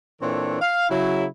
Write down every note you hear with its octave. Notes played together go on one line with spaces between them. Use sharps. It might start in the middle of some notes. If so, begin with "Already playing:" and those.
A#2 E3 C4 D4 A4 C#5
F5
C#3 F#3 E4